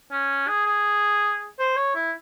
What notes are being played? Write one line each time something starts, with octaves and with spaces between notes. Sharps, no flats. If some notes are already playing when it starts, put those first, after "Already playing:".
C#4
G#4
G#4
C5
C#5
E4